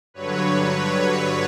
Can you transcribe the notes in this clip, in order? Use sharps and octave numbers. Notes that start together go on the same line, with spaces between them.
G2 D3 F#3 B4 C#5
B4 C#5